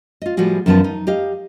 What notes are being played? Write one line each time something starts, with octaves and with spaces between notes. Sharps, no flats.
F4 D#5
A2 F3 G3 F#4 G#4
F#2 D#3 F3 B3 F4 A5
D#4
G4 D#5 F5